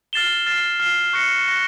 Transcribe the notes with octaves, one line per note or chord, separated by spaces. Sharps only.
F6 A6 C7 E7 G7
F6 A6 C7 E7 G7
F6 A6 C7 E7 G7
C#6 F#6 A#6 C#7
C#6 F#6 A#6 C#7